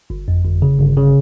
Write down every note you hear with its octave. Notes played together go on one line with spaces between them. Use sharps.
G1
F2
G1
C#3
G1
C#3